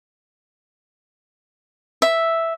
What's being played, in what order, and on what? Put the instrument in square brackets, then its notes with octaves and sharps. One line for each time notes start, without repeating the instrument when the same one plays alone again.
[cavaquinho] E5